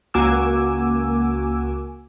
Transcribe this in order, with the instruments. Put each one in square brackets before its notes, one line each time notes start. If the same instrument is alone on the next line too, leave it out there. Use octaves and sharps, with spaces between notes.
[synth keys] C#2 A#3 F#4 G#5 D6 E6